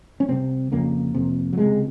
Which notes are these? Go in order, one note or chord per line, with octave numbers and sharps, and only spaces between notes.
C#4
C2 C3 C4
F2 C#3 A#3
F2 C3
F#3
C#2 C3 G#3